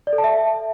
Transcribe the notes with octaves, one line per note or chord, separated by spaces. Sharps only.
D5
A4
A5
E5